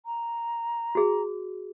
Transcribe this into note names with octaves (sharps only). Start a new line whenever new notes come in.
A#5
F#4 G#4